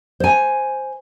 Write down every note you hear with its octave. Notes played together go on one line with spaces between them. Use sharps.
C5 G#5